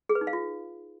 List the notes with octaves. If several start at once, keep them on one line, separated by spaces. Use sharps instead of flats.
G#4
B4
D#4
F5
F4